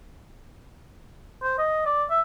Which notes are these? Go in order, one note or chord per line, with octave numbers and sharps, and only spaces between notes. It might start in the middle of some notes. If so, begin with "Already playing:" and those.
C5
D#5
D5
E5